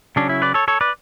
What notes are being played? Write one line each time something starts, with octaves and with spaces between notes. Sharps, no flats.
C#3 F#3 C#4 D4
E4
B4 D5
A4 C#5
A4 C#5
B4 D5